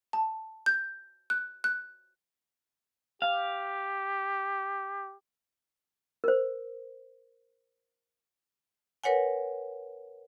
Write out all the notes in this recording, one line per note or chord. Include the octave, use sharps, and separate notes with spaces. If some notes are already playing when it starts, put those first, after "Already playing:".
A5
G6
F#6
F#6
G4 F5
A#4 C5
A#4 B4 C#5 F#5 G#5